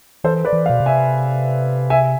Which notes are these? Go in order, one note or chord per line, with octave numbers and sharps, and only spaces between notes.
E3 A4 C5
B4 D5
E3
D5 F5
B2
C3
E5 G#5
E5 G#5